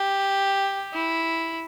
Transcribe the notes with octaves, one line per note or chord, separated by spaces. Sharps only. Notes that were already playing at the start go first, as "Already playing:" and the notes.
Already playing: G4
E4